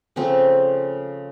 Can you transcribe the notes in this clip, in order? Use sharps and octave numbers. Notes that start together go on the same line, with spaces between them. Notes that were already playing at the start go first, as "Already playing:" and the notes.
C#3 F3 A3 C4